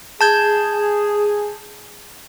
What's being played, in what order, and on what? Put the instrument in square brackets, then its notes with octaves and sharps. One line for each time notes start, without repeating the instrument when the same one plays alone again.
[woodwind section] G#4 [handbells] A5 G6 G#6